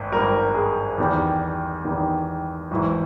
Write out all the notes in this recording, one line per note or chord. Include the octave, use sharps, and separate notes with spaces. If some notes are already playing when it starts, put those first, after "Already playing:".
Already playing: G#1 G2
G#1 G2 G3 A#4
G#4
E2 D#3 G3
E2 D#3 G3
G#1 G#2 E3